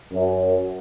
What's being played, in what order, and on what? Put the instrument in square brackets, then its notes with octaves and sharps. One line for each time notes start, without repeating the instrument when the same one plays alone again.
[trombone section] F#2